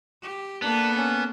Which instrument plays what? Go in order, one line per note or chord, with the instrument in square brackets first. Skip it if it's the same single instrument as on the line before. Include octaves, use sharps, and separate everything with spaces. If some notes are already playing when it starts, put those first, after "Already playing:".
[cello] G4
[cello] A#3 A4 [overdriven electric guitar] B3 [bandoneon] D4
[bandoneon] C#4